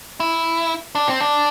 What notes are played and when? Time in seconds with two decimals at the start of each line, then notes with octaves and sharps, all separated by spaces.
0.20 E4
0.95 D4
1.07 C4
1.21 D4